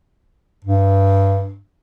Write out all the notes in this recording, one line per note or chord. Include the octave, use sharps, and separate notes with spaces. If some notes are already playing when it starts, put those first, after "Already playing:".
G2